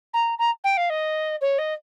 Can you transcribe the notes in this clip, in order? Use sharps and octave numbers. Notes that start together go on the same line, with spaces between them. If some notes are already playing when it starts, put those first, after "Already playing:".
A#5
A#5
G5
F5
D#5
C#5
D#5